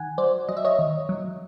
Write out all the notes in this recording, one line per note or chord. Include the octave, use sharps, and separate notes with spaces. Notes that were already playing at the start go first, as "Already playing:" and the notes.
Already playing: D#3 F#5 G#5
F#3 C5 D5
F#3 D#5
E5
C#5 D#5
D#3
F#3